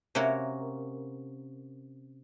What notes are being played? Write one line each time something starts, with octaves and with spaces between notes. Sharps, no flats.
C3 A#3 C#4 F#4 A#4